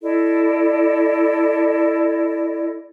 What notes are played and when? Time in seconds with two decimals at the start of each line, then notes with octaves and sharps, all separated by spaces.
0.03 E4 A4 D5 D#5